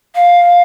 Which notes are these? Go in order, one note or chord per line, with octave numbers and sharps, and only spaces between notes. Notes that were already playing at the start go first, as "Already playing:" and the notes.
F5